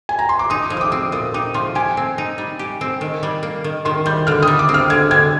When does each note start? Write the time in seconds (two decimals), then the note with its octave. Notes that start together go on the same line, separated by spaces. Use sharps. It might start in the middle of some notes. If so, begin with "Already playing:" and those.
0.09 G#5
0.19 A#5
0.29 C6
0.39 D6
0.50 D#4 D#6
0.70 F3
0.77 D#6
0.81 D6
0.92 C4
1.12 A#2 D#6
1.34 D#4 D6
1.54 F3 C6
1.75 G4 G#5
1.97 C4
2.18 D#4
2.38 G3
2.59 G4
2.81 C4
3.01 D#3
3.23 G3
3.43 A#3
3.64 D#3
3.85 D#3 C6
4.06 G3 G6
4.27 D3 F6
4.43 G3 D#6
4.59 D6
4.69 C4
4.74 F6
4.90 D3 G#6
5.11 D3 G#6